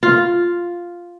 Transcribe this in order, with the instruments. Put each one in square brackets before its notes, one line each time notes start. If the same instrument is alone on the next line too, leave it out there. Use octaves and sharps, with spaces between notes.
[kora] F4